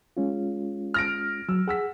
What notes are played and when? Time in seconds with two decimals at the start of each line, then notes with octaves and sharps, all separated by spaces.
0.17 G#3 C#4 F4
0.94 F6 A#6 D7
1.49 F#3 E6
1.68 G#4 F#5 E6 B6